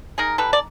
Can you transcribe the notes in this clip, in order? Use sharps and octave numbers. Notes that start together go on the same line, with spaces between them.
D#4 G#4 A#4
G3 A4 B4
D5